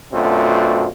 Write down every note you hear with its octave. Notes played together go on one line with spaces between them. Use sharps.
F#2 B2 A3 C4 D4 F4